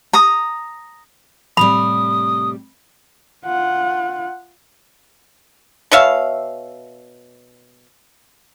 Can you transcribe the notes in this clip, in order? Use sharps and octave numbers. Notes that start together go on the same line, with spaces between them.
A#5 D#6
A2 C3 G3 B5 D#6
F4 F#5
B2 C#5 E5 F5